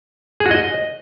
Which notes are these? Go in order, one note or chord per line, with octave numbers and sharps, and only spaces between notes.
G#4
F#4
D#5